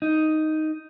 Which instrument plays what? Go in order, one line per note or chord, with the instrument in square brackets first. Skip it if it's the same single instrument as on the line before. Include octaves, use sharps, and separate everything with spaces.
[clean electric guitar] D#4